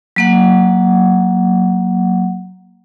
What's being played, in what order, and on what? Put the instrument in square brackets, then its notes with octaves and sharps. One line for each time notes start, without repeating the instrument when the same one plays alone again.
[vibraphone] F#3 A#3 F#5